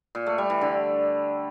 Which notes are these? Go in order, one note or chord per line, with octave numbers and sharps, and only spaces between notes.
A#2
A3
G3
E3
D3